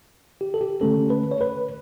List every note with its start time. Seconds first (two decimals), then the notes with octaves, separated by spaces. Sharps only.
0.41 G4
0.54 A4
0.61 G4
0.81 D3 A3 C#4 A4
1.10 B4
1.31 C#5
1.41 B4